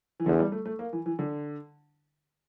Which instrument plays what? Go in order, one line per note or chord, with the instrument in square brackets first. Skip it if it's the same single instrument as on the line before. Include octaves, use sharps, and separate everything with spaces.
[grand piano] E3
[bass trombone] E2 [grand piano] D3
[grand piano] G3
A3
A3
A#3
E3
E3
D3